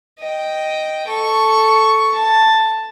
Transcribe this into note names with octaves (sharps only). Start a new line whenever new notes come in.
D#5 G5
A4 C#6
A5